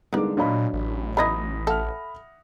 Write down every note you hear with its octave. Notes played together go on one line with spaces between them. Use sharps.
C2 D3 G#3 A#3 B3 D#4 D6
A#2 F#3 D4 C#5 D#5 F5 B5
A1
B3 D#4 E4 B5 D#6 A#6
A4 E5 F#5 F6